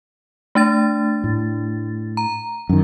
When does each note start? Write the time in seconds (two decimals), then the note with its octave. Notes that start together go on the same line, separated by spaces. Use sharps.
0.55 A3 D4 A6
1.24 A2
2.17 A#5
2.69 F#2 D#3